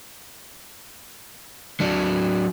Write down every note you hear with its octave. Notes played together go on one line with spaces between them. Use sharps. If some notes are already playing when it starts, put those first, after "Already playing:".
F#3 D4